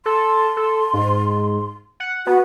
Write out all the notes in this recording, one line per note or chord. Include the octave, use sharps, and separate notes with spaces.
A4 C6
A4
G#2
F#5
B3 F#4